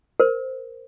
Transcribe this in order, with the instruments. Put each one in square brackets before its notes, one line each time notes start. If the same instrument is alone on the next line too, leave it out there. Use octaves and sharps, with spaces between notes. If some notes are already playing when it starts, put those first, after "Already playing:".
[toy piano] A#4 C5